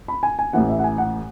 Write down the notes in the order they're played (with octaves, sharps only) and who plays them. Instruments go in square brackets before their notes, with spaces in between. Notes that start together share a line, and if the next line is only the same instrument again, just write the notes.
[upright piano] B5
G#5
G#5
[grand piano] A1 A2 E3 [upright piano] F#5
[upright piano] E5
F#5
G#5
F#5